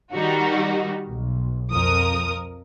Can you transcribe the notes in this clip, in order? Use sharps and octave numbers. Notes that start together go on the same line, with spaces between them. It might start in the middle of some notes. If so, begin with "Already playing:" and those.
D#3 G3 D#4 F#4
B1
F2 A#4 D#6